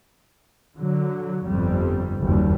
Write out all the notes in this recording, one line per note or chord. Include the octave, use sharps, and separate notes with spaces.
D3 F#3
G1 F2 G3
F#1 D#2 G3